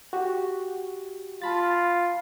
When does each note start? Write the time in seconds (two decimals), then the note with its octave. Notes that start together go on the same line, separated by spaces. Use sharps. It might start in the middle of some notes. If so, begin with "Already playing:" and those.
0.13 F#4 G4
1.42 F4 A5 B5 A6